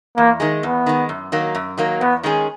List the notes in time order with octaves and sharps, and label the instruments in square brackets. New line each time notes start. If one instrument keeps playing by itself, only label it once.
[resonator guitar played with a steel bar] E2 [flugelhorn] A#3
[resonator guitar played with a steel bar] D#3 G#3
[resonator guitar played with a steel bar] E2 [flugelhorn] B3
[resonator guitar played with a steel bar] D#3 G#3
F#2
D#3 F#3 A#3
F#2
D#3 F#3 A#3
[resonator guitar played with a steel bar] E2 [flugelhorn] B3
[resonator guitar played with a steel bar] D#3 G#3 C#4 G#4